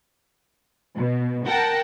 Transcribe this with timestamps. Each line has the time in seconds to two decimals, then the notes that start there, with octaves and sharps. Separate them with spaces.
0.96 B2
1.47 A#4 F#5 G5 A5